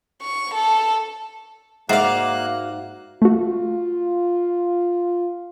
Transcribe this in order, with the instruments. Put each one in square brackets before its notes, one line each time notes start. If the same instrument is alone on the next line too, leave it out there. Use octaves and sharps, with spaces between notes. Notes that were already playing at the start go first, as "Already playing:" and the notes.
[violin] C#6
A4
[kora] G#2 D5 [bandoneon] A#3 F#6 [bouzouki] F#4 F5 [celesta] E5 C7
[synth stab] A3 F#4 [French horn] F4